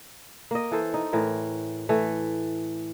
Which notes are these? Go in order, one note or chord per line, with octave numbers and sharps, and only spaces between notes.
A#3 D#5
E3 A4 C5
D#4
A2 E3 A#4
E3 A3